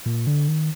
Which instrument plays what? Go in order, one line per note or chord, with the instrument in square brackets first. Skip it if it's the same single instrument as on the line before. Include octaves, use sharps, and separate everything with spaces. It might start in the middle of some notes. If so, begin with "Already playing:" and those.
[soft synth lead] A#2
D3
D#3